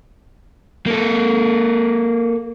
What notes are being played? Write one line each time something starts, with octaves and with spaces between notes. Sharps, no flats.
A#3 A4